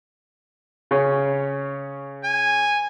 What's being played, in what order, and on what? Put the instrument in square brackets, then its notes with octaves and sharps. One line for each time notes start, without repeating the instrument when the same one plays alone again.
[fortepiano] C#3 C#4
[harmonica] G#5